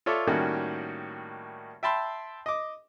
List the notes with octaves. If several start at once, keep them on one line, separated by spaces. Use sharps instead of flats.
F4 A4 C#5 D5 E5
A2 D#3 G3 A#3 C#4 F#4
E5 G5 A5 B5 C6 E6
D#5 D6